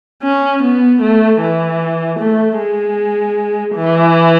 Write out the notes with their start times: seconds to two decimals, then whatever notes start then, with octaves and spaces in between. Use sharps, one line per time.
0.23 C#4
0.63 B3
1.01 A3
1.41 E3
2.19 A3
2.58 G#3
3.76 E3